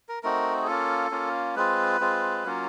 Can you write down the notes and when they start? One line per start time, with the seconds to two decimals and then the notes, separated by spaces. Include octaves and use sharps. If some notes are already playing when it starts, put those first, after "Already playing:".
0.09 A#4
0.23 A3 C4 D#4 F#4 A#4
0.62 G#4
0.67 A#3 C#4 F4 A4
1.11 A#3 C#4 F4
1.56 G#3 C4 F4 B4
2.00 G#3 C4 F4
2.44 F#3 A#3 C#4 F4